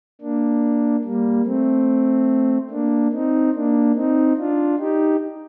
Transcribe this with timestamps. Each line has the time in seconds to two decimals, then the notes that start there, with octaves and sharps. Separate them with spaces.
0.21 A#3 D4
1.04 G3 A#3
1.46 A3 C4
2.70 A#3 D4
3.13 C4 D#4
3.54 A#3 D4
3.95 C4 D#4
4.37 D4 F4
4.79 D#4 G4